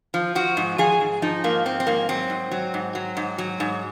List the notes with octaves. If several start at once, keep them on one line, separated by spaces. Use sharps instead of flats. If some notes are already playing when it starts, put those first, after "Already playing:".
F3
F3 F#4
G#2
F3 G#4
G#2
F3 D#4
G#2 A#3
F3 C4
C4
G#2 A#3
F#3 C4
G#2
F#3
G#2
F#3
G#2
F#3
G#2